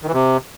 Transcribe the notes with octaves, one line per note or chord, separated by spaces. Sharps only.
D#3
E3
C3